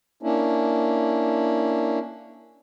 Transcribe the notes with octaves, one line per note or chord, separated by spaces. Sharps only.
A#3 C#4 D4 E4